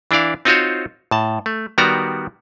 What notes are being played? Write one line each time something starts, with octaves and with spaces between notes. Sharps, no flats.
E3 D4 E4 D5 F5
C4 D#4 F4 F#4 C5 C#5
A2 A5
A3
D#3 G3 B3 F#4 D5 A#5